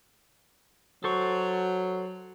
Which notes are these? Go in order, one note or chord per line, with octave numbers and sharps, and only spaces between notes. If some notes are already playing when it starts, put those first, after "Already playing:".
F#3 A4 C5 C#6